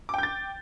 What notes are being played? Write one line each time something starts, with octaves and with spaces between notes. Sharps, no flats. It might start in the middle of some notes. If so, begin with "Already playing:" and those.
G5 D6 G6 A6